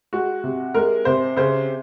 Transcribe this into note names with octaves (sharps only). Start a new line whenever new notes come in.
G#3 F#4
C3
G#3 A#4
C3 C5
C#3 C5